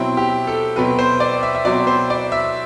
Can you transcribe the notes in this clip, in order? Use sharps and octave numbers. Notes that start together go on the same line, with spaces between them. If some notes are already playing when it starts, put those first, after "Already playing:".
Already playing: B2 F#3 C4 E4
G4
A4
B2 F#3 C4 B4
C5
D5
E5
E5
B2 F#3 C4 D5
C5
D5
E5